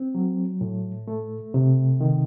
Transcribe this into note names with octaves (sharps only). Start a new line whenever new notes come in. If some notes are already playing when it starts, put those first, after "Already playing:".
Already playing: C4
F#3
A2
A3
C3
D#3